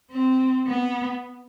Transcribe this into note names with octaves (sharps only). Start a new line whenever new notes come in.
C4
B3